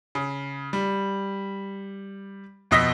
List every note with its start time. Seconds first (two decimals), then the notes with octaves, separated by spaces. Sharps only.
0.15 C#3
0.73 G3
2.71 F2 B2 D#5 E6 A#6 B6